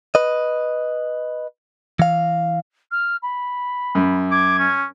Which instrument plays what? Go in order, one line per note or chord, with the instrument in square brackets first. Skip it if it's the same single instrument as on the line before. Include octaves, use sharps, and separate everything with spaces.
[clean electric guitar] B4 D#5
E3 F5
[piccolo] F6
B5
[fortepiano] F#2
[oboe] D6 [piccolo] G#6
[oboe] C#4